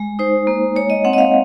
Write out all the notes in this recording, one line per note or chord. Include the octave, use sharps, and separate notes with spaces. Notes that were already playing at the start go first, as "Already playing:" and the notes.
Already playing: G#3
D#4 C5
A#3
G#3 C#5
D#5
C4 F#5
D#5
F5